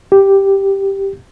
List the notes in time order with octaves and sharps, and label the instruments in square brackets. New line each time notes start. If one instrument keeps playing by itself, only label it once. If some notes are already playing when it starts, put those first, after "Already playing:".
[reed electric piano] G4